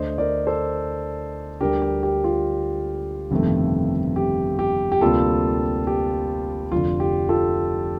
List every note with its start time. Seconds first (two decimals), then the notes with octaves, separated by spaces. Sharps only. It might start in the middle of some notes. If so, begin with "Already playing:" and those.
Already playing: D2 D3 A3 C5 D#5
0.18 A#4 D5
0.47 A4 C5
1.61 D2 D3 G3 G4 A#4
1.82 G4
2.03 G4
2.24 F4
3.31 G1 F2 C3 D#3 A3
4.16 G4
4.59 G4
4.92 G4
5.01 D2 C3 G3 A#3 F4 A4
5.87 G4
6.72 F1 F2 D3 F4
7.00 G4
7.29 F4 A4